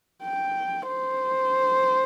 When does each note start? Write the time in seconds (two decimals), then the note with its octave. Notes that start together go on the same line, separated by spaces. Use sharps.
0.23 G5
0.87 C5